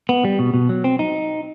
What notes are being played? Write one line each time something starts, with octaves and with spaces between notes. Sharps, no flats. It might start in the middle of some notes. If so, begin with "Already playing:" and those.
B3
G3
B2
B2
F#3
C4
D#4